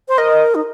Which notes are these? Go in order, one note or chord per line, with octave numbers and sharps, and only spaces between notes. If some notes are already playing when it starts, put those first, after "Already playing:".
C5
A#4 D#5
D#4